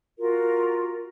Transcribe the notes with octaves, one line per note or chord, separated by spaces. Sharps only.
F4 F#4 A#4